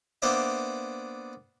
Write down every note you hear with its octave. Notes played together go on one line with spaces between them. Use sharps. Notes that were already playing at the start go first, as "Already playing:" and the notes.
A#3 B3 D4 C5 D5 E5